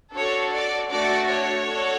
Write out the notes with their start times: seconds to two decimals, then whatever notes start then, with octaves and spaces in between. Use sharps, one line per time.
0.15 D4 F#4 A4 C#5
0.53 D5
0.91 A3 D4 F#4 A4 D5
1.29 C#5
1.66 D4 F#4 A4